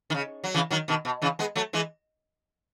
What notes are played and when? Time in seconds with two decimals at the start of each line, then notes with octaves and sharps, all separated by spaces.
0.10 D#3
0.14 C#3
0.44 F#3
0.54 C#3 E3
0.71 D#3 F#3
0.88 B2 D#3
1.05 B2
1.22 C#3 E3
1.39 G#3 B3
1.56 F#3 A3
1.73 E3 G#3